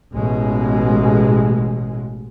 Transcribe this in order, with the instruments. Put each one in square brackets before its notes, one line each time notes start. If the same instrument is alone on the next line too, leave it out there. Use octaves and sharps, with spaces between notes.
[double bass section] A1 B2 G#3